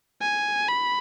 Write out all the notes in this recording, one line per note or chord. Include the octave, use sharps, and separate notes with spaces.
G#5
B5